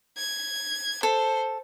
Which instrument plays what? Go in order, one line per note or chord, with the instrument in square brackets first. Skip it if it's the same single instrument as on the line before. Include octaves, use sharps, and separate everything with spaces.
[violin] G#6
[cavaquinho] A4 [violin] C5